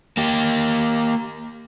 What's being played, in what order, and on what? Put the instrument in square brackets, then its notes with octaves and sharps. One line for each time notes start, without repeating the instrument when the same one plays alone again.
[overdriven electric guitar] A#3 G4